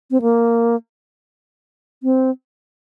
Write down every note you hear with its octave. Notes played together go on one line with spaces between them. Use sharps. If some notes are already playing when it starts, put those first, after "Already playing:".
C4
A#3
C4